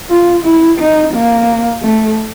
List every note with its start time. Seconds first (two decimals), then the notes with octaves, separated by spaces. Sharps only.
0.10 F4
0.44 E4
0.79 D#4
1.14 A#3
1.82 A3